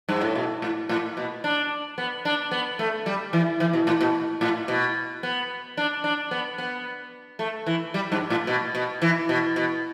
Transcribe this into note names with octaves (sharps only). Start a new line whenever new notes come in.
G2
A2
B2
A2
A2
B2
D4
B3
D4
B3
A3
G3
E3
E3
B2
A2
B2
A2
B2
B3
D4
D4
B3
B3
A3
E3
G3
G2
A2
B2
B2
E3
B2
B2